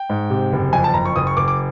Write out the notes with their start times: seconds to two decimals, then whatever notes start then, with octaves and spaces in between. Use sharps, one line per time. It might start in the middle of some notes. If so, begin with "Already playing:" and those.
Already playing: G5
0.10 G#2
0.30 C3
0.53 F#1
0.73 F2 G#5
0.84 A5
0.94 F#1 A#5
1.05 C#6
1.16 F#1 D#6
1.27 C#6
1.37 F#1 D6
1.48 D6